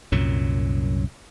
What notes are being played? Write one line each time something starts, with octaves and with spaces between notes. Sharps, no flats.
C2 F#2 A#2 F#3